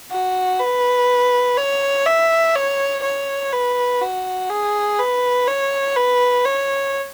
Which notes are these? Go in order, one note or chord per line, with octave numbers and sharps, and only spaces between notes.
F#4
B4
C#5
E5
C#5
C#5
B4
F#4
G#4
B4
C#5
B4
C#5